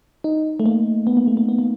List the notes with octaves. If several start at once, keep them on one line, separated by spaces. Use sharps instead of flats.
D#4
A3
A#3
B3
A#3
A3
A#3
B3
A#3